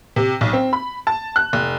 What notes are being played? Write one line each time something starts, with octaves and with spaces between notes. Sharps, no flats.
C3
B1
C4
B5
A5
F#6
F1